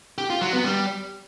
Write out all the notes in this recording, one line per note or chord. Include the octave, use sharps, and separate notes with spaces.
G4
F4
F#3
B3
G3